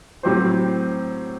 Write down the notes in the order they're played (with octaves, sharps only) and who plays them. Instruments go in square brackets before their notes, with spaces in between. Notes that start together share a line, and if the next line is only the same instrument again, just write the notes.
[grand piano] A2 F#3 C4 G4 C5